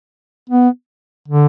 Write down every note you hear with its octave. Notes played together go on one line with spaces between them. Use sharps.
B3
D3